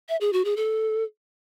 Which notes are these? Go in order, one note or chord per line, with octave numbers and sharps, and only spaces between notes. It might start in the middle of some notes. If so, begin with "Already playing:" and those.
E5
G#4
F#4
G#4
A4